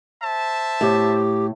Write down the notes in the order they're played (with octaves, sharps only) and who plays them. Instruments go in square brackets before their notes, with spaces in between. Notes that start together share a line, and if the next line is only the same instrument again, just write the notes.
[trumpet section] C5 E5 A5
[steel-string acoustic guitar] A2 [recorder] G4